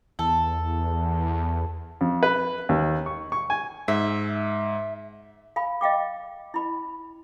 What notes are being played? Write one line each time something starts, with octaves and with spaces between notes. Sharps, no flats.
E2 A4
F2
B4
D#2
C#6
C#6
G#5
G#2 E5
F5 G#5 B5
D#5 F5 G5 D6
E4 B5